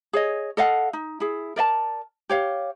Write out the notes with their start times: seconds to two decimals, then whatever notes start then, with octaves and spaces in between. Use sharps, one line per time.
0.13 G#4 C#5 D#5
0.57 A4 D#5 F5 F#5
0.93 D#4
1.20 E4 G#4
1.56 A#4 D5 D#5 A5
2.29 G4 C#5 F5